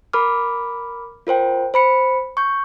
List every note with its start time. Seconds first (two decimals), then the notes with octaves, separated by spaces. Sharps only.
0.13 A#4 B5 D6 F6
1.27 F4 A#4 C5 G5
1.74 C5 B5 C#7
2.37 C#6 G6